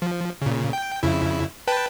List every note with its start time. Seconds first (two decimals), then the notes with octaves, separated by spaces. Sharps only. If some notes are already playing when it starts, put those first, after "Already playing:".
0.02 F3
0.42 A#2 C#3
0.73 G5
1.03 F2 C#3 E4
1.68 B4 G5 A5